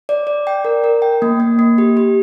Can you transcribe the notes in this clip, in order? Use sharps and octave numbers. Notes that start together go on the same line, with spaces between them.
D5
D5
G5
A#4
A#4
G5
A#3
A#3
A#3
G4
G4